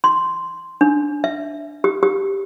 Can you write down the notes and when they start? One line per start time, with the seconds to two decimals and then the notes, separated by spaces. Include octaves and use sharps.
0.04 C6
0.81 D4
1.24 E5
1.84 G4
2.03 G4